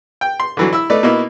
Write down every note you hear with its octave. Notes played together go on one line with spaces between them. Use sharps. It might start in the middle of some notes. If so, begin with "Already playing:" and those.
G5
C6
D3 E3 F#3
E4 E6
A3 D#4 B4 D5
B2 A#3 D#4 E4 B4